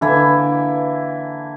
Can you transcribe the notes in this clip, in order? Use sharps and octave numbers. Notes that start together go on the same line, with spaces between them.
D3 E3 A#3 E4